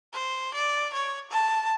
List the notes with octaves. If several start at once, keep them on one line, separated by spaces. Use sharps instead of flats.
C5
D5
C#5
A5